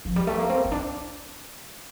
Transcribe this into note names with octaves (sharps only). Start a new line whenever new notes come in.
F3
G3
A3
A#3
C4
C4
D4